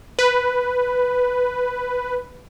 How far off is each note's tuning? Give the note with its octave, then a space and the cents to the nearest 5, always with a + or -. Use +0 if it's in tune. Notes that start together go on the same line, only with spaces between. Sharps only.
B4 +5